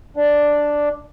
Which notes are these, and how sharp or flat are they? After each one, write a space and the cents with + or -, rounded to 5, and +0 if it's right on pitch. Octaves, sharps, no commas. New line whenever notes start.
D4 +0 D5 +0